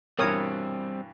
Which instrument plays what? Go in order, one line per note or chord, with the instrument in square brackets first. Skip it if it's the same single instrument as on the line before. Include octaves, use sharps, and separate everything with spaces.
[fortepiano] G2 B2 E3 [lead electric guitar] G3 C4 [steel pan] A#4 C#5 D#6